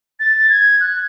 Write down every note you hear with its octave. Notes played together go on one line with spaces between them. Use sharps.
A6
G#6
F#6